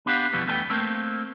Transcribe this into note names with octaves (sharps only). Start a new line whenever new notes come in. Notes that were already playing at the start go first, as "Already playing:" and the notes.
B3 D4 G4 F5 F#5
F2 B2 E3 G3 B3
E2 A3 B3 A4 B4 G5
A3 A#3 C4